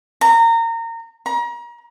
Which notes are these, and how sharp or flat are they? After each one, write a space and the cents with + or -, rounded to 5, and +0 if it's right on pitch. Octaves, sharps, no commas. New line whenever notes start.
A#5 -25
A#5 +35